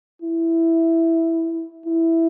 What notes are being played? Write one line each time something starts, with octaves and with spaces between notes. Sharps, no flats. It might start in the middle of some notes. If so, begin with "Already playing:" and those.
E4
E4